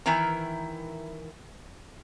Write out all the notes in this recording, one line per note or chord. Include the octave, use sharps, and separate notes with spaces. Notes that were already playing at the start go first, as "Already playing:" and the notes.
D#3 E3 E4 A#4 A#5